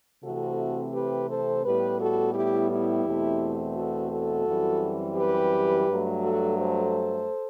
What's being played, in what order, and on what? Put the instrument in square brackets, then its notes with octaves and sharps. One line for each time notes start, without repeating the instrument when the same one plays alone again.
[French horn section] C3 E3 A3 C4 F#4 A4
G4 B4
A4 C5
A2 G3 B3 G4 B4
F#4 A4
E4 G4
E4 G4
E2 B2 A3 C4
F#4 A4
F#4 A4
F#2 E3 G3 C4
G4 B4
G2 F#3 A3
F#4 A4
A4 C5